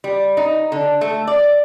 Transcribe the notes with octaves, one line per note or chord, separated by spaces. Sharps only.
G3
D#4
D3
A3
D5